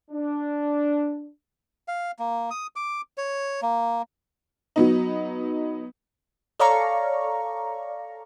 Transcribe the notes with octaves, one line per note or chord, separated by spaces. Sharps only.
D4
F5
A#3
D#6
D6
C#5
A#3
F#3 B3 D#4
A4 C#5 D5 F5 A#5 C#6